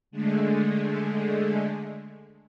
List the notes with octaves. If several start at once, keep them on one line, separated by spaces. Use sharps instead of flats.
D3 G#3 A3